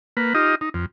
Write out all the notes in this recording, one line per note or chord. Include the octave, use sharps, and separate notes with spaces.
A#3 B4
D#4 F4 G4 D#5
D#4
F2